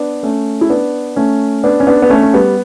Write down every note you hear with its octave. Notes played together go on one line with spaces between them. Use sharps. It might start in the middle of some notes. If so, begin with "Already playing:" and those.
Already playing: B3 D4
A3 C#4
E4
B3 D4
A3 C#4
B3 D4
C#4
B3 D4
B3
A3 C#4
C#4
G3 B3